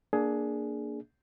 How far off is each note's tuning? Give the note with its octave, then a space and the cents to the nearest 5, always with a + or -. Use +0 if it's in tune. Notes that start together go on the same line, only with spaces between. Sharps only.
A#3 +0 D4 +0 G#4 +15